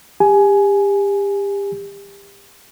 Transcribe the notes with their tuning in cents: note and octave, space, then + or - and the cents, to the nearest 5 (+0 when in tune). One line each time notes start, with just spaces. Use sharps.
G4 +30 G#5 +15